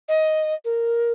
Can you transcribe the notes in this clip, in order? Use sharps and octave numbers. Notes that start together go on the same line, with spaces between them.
D#5
A#4